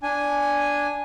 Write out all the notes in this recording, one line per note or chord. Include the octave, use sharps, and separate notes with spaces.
D4 G#5